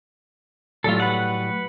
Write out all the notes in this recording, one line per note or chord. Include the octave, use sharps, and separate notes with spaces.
A2 F#3 G3 F4 A4
B4 F#5